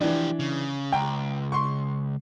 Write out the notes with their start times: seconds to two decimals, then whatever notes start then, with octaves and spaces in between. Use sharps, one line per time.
0.01 E3 F3 D4 G4
0.39 C#3
0.92 C#2 G5 A#5
1.52 C6 C#6